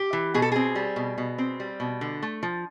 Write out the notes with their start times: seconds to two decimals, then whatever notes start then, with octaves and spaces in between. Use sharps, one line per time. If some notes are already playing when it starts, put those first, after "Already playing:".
Already playing: G4
0.13 E3
0.34 B2 G#4
0.42 A4
0.52 C4 G#4
0.75 G3
0.96 B2
1.18 B2
1.38 C4
1.60 G3
1.80 B2
2.01 D3
2.22 A3
2.43 F3